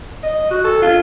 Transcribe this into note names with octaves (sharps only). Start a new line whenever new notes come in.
D#5
F#4
A4
F4